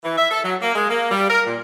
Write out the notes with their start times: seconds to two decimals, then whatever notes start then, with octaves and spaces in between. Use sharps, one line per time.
0.04 E3
0.17 E5
0.31 A4
0.43 F#3
0.62 A#3
0.75 G#3
0.89 A#3
1.11 G3
1.29 A#4
1.45 A#2